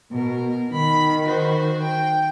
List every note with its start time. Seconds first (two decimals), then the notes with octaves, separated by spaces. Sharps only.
0.13 B2 A#4
0.71 D#3 B5
1.24 F#4 C5
1.81 G5